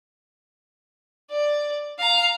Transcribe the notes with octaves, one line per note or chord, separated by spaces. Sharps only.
D5
F5 A#5